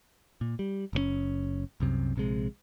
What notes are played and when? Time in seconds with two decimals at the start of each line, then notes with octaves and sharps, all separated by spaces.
0.41 A#2
0.59 G3
0.93 F#1 C3 C#4
1.80 C2 F#2 C3
2.16 A#1 C3 G#3